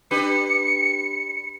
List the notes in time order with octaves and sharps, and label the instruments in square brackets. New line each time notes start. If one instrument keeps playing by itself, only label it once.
[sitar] D4 G4 B4 [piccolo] C#7